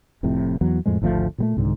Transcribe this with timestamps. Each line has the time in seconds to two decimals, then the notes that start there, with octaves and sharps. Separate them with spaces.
0.23 F1 F2 A2 C3
0.61 E2 E3 F#3 B3
0.86 F2 A2 F3 G#3
1.02 G#1 D2 F3 A3
1.38 A#2 G3 A3
1.57 C2 G#2 D3 D#3